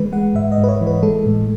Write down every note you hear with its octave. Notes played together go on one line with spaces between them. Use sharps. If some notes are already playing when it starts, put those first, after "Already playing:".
Already playing: E3 G#3 B4
G#3 F#5
G#2 E5
D#5
G#2
B4
C#5
E3
B4
G#3 A4
A2